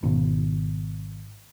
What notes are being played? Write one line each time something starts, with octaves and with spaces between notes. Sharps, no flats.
G#1 B2 D#3